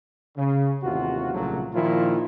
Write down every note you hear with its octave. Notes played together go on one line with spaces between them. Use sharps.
C#3
A1 D#2 C3 F4 F#4
C2 A#2 C#3 F3 F#3 A3
A#2 D#3 F3 E4 F4